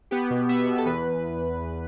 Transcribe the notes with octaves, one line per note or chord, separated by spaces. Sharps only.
B3 G4
B2
B3 E5
B2
A4
E2 B4